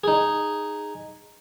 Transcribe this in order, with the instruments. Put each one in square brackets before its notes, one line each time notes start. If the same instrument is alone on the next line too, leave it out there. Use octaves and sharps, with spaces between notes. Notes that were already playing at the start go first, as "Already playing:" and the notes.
[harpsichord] D#4 G#4